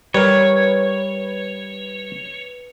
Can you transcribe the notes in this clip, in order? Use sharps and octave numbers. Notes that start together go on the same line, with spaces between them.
G3 A#4 B4 C#5